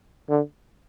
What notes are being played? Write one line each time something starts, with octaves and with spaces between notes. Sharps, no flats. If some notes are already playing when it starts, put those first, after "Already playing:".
D3